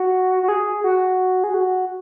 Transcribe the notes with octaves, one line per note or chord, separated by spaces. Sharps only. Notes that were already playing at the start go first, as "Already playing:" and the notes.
Already playing: F#4
F#4
G#4
F#4
G#4
F#4